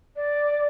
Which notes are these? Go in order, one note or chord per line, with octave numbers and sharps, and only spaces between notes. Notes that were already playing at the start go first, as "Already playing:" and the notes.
D5